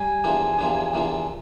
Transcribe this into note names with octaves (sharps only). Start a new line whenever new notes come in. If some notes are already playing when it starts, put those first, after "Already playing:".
Already playing: G3 G#5
E2 C3 F3 A#3 D4
E2 C3 F3 A#3 D4
E2 C3 F3 A#3 D4